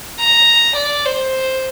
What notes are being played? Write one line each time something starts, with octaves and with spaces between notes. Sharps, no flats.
A#5
D5
C5